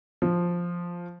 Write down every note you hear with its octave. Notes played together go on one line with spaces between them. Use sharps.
F3